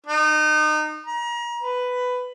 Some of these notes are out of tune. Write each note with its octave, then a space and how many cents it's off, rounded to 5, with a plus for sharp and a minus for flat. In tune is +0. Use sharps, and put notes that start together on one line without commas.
D#4 -30
A#5 +35
B4 +10